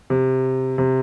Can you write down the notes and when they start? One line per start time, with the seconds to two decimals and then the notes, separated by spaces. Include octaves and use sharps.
0.10 C3
0.78 C3